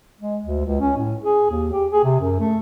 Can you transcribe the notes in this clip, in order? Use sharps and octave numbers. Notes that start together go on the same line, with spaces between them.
G#3
D2
C#2
C#4
A2
G#4
D#2
G4
G#4
C3
F#2
A3